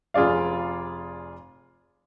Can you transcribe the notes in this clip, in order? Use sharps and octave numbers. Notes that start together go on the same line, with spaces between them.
F1 F4 G#4 D5 F5